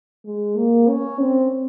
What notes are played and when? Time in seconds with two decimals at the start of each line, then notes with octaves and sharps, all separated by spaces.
0.25 G#3
0.57 A#3
0.88 C#4
1.21 C4